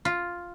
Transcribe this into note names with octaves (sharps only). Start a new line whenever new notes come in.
F4